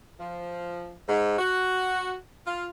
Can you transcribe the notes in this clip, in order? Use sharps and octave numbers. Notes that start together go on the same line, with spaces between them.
F3
G#2
F#4
F4